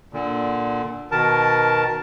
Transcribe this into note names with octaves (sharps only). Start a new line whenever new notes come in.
A#2 D3
B2 D#3 A#4 A5